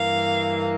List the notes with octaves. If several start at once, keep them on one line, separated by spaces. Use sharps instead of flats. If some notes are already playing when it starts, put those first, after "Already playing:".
Already playing: G2 E3 A#3 F5